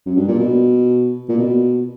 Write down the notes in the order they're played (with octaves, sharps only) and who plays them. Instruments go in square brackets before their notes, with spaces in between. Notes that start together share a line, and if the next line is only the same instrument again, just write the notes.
[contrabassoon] F#2
G2
A#2
B2
A#2
B2